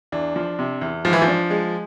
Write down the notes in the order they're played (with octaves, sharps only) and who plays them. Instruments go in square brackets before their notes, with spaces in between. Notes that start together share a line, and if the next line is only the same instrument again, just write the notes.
[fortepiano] E2 [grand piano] D4
[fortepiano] F3
C3
E2
[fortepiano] G#2 [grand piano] F3
[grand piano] E3
F3
[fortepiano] D4
G#3